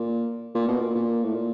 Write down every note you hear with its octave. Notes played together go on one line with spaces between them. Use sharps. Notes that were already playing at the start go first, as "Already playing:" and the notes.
Already playing: A#2
A#2
B2
A#2
A#2
A2
A#2